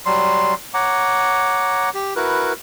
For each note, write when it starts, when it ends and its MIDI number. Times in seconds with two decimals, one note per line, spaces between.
0.06 0.54 54
0.06 0.54 55
0.06 0.54 84
0.74 1.89 73
0.74 1.89 78
0.74 1.89 82
0.74 1.89 86
1.94 2.14 67
2.16 2.53 64
2.16 2.53 66
2.16 2.53 70
2.16 2.53 71